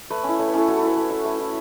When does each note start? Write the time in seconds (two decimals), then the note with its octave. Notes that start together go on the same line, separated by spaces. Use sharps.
0.10 A3 B4
0.24 C#4 E4
0.39 A3 C#5
0.48 B4
0.54 C#4 E4 A4
0.68 A3 F#4
0.77 A4
0.83 E4 B4
0.97 A3 E5
1.10 E4
1.25 A3
1.40 E4